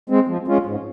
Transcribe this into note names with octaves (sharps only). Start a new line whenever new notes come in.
G#3 C4
F3
G#3 C#4 F4
G#2